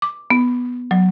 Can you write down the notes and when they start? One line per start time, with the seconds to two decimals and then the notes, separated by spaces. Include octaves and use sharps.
0.02 D6
0.30 B3
0.91 F#3